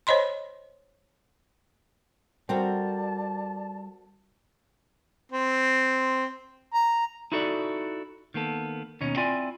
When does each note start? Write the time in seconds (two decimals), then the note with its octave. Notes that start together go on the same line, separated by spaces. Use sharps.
0.07 C5 C#5 D#5 B5 C6
2.49 G3 C4 F#4 A4 A#4 D5 A5
5.32 C4
6.74 A#5
7.32 D#4 E4 F#4 A4 C#5 D5
8.34 D#3 A#3 B3 A4
9.01 D#2 B2 C#4 D#4
9.16 C4 E4 F4 D5 G#5